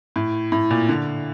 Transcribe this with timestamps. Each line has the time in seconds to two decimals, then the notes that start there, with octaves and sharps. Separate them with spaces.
0.16 A2
0.52 A2
0.71 A#2
0.89 D3